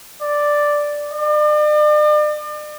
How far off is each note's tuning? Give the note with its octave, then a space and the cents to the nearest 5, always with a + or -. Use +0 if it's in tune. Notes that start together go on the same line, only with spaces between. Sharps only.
D5 +0
D5 +40